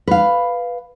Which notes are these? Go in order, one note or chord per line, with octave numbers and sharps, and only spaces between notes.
B4 F5